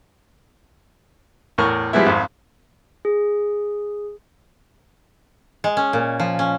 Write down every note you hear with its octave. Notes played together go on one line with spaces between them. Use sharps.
E2 A2 A#4 C#6
F3 G3 G#3 B3 E4
G#1 F2
G#4
G#3
C#4
A#2
F3
C#4